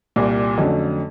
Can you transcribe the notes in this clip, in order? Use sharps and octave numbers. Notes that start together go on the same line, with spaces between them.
C2 A#2 G3
F2 D3 F#3 A3 C#4